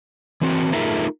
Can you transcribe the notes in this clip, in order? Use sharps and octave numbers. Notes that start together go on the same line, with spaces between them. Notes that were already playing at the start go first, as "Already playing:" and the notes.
E3 C4 F#4
A3 D#4 F4 G#4 A#4 E5